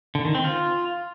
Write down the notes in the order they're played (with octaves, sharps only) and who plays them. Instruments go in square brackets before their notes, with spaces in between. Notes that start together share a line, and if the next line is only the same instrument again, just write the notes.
[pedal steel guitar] D3
D#3
C4
F4